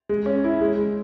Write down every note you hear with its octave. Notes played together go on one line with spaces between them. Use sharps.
G#3
C#4
E4
G#3
G#3